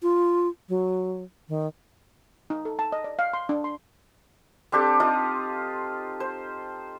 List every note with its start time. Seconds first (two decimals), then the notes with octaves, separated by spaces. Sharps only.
0.03 F4
0.69 F#3
1.48 D#3
2.50 D#4
2.65 A4
2.79 A5
2.92 D#5
3.04 D5
3.19 F5
3.33 C6
3.49 D4
3.64 C6
4.72 C4 D4 G4 A4
5.00 D#4 F4 D#6
6.20 C5